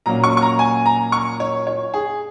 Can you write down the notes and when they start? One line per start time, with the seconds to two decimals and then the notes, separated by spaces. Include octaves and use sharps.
0.06 A#2 F#3 A#3 C#4 A#5
0.24 C#6
0.37 C#6
0.42 A#5
0.59 G#5
0.86 A#5
1.12 C#6
1.40 C#5
1.67 C#5
1.94 G#4